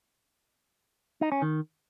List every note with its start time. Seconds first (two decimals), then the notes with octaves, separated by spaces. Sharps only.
1.21 D#4
1.32 C#4
1.42 D#3